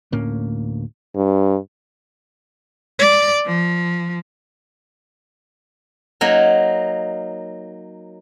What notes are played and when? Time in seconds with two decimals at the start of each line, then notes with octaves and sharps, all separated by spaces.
0.12 D2 A2 A#3 C#4
1.16 G2
2.99 D5
3.46 F3
6.21 F#3 A#3 D#4